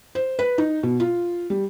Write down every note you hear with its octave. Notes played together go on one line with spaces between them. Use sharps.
C5
B4
D#4
B2
F4
G3